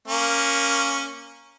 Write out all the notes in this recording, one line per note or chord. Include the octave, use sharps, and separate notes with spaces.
A#3 C#4